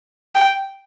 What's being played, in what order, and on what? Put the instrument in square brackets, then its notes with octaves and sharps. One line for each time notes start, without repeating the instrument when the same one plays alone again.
[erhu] G5